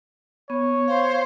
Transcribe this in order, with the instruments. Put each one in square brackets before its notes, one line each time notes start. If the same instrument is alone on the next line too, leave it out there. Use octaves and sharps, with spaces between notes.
[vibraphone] B3 [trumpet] C#5
[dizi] C5 [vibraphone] F5